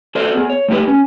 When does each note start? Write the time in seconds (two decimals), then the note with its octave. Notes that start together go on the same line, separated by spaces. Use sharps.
0.15 F#4 A4 C5 D5 E5
0.34 B3 G#4
0.50 C#5
0.68 A3 D#4 G4 B4
0.88 C#4